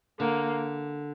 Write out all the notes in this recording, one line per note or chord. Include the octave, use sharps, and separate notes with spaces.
D3 A#3